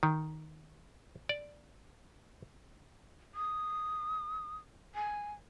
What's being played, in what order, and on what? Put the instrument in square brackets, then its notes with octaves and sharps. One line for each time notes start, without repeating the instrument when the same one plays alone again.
[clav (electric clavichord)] D#3
D5
[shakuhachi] D#6
G#5